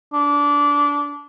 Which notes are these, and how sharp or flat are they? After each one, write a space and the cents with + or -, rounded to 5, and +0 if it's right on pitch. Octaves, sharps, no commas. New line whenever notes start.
D4 -20